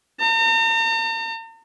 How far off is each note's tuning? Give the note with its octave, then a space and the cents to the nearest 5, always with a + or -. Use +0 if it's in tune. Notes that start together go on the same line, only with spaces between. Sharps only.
A#5 -45